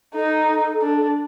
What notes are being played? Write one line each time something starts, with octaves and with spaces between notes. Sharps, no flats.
D#4 A4
D4